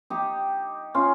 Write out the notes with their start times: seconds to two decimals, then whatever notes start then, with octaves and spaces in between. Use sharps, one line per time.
0.10 D#4 G4
0.95 C#4 F4